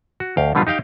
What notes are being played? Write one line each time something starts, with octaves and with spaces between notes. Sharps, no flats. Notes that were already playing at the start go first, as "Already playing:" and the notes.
F#4
D2 F5 G5
B2 D3 G3 B3 F4
D#4 G4 F5 G5